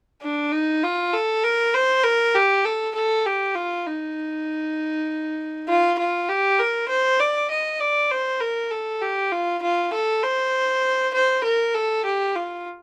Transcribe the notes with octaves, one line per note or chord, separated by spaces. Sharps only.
D4
D#4
F4
A4
A#4
C5
A#4
G4
A4
A4
G4
F4
D#4
F4
F4
G4
A#4
C5
D5
D#5
D5
C5
A#4
A4
G4
F4
F4
A4
C5
C5
A#4
A4
G4
F4